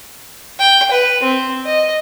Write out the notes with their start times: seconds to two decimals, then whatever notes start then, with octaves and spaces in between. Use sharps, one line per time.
0.59 G5
0.91 B4
1.23 C4
1.65 D#5